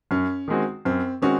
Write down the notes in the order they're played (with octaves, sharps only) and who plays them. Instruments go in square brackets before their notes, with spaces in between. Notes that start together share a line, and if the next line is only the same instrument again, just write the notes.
[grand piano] F#2 [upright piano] C#4
[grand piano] D#3 G#3 C4 F#4
[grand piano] F#2 [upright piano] C4
[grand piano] D#3 G#3 C4 F#4 [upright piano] C#4